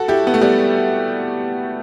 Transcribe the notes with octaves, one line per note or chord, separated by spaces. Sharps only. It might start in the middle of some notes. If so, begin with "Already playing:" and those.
Already playing: F#4 A4
E4 G4
B3
A3
G3 B3